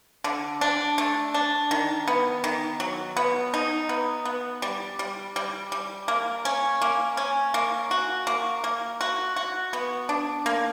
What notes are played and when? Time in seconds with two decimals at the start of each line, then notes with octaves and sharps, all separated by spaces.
0.24 D3
0.61 D4
0.98 A3
1.34 D4
1.71 D#3
2.08 B3
2.44 D#3
2.80 F#3
3.17 B3
3.54 D#4
3.89 B3
4.25 B3
4.62 G3
4.99 G3
5.36 G3
5.72 G3
6.08 A#3
6.45 C#4
6.81 A#3
7.17 C#4
7.54 A#3
7.91 F#4
8.27 A#3
8.64 A#3
9.01 F#4
9.36 F#4
9.73 B3
10.09 D4
10.46 A#3